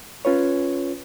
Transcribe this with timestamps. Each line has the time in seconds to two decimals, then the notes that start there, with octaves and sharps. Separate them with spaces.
0.25 C#4 F4 B4 C#5